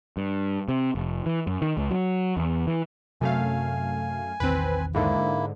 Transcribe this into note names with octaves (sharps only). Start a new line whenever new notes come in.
G2
C3
F1
E3
F#2
D#3
C#2
F#3
E2
E3
F#2 C3 A3 F5 G#5
A#1 E2 D#3 C4 B4
G#2 D3 A#3 E4